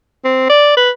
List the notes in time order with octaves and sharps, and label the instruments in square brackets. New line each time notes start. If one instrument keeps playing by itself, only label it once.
[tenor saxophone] C4
D5
B4